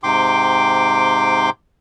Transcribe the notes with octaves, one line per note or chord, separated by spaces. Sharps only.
G#2 C3 G5 C6 D6